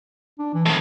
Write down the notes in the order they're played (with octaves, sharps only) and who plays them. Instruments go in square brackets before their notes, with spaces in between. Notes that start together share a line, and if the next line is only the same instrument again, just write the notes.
[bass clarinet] D4
E3
[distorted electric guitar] A2 D#3 [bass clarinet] F3